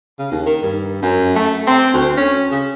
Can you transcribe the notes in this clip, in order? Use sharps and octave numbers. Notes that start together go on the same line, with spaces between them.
C#3
D#2
D#3
G2
F#2
A3
C4
D2
C#4
C#3